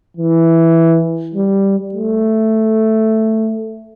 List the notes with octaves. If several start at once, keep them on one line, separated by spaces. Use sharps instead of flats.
E3
G3
A3